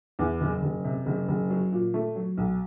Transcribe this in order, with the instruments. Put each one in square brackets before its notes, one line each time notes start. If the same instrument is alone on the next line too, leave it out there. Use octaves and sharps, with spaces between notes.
[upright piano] E2
F#1
F#1
C3
F#1
F#1
F#3
A#2
A3
F#3
B1